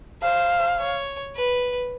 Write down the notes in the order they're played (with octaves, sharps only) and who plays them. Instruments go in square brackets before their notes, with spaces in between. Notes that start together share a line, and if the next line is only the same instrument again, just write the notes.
[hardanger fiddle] C5 [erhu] F5
[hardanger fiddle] C#5
B4